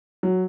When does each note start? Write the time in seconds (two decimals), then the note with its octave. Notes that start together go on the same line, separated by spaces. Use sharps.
0.23 F#3